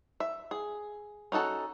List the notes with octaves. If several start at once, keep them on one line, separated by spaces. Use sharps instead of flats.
E5
G#4
C#4 D#4 F#4 A4